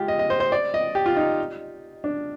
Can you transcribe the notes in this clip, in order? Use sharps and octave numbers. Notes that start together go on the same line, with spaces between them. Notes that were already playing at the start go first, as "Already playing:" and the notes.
Already playing: G#3 F4 G4
D#5
D#5
C5
C5
D5
D#5
G4
F4
D#4
D4